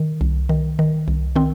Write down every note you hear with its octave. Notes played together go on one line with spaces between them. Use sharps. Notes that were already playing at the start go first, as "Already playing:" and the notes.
Already playing: D#3
C2
D#3
D#3
C2
D#3 C4